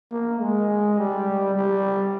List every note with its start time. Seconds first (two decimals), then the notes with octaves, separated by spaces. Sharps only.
0.11 A#3
0.41 G#3
0.98 G3
1.55 G3